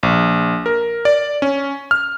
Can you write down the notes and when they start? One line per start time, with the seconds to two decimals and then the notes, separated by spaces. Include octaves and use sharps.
0.03 A#1
0.66 A#4
1.05 D5
1.42 C#4
1.91 F6